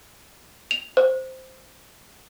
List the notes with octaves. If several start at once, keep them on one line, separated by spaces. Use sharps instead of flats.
F7
C5